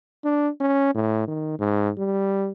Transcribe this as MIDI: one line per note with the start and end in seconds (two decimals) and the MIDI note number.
0.24 0.49 62
0.60 0.90 61
0.95 1.27 45
1.27 1.59 51
1.59 1.90 44
1.98 2.51 55